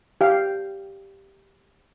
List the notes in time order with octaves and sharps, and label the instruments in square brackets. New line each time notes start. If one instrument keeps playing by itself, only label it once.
[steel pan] G4 F5